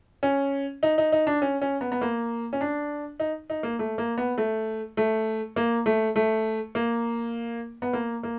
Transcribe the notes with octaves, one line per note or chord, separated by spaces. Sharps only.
C#4
D#4
D#4
D#4
D4
C#4
C#4
B3
B3
A#3
C#4
D4
D#4
D#4
A#3
A3
A#3
B3
A3
A3
A#3
A3
A3
A#3
B3
A#3
A#3